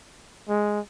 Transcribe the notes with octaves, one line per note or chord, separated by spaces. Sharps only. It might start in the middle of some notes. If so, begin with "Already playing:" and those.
G#3